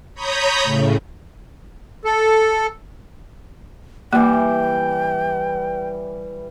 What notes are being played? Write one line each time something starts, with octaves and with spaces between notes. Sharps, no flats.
C#5 A#5 B5 D#6 G6
A2 C#3
A4
E3 G3 A#3 G5